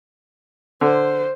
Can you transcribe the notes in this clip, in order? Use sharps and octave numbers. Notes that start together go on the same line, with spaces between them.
D3 C5